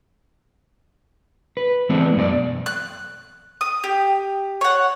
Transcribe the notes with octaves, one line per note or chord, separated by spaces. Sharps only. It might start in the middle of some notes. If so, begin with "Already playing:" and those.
B4
E3 G#3 A3 B3 C4 D4
F#2 B2 F#4 D5
F#6
D#6
G4
C#5 F#5